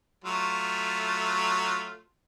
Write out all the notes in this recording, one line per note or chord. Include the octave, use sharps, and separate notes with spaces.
F#3 A3 F4